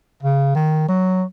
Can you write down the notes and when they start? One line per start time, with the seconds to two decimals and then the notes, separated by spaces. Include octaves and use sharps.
0.23 C#3
0.55 D#3
0.89 F#3